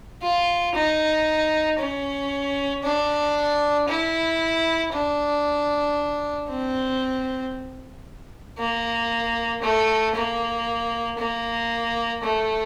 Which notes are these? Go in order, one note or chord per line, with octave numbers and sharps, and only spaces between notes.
F4
D#4
C#4
D4
E4
D4
C4
A#3
A3
A#3
A#3
A3